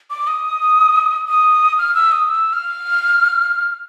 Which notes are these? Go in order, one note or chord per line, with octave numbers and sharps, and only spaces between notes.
D6
D#6
D#6
F6
E6
D#6
E6
F6